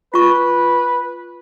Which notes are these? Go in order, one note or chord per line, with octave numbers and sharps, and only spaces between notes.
F4 B4 C#6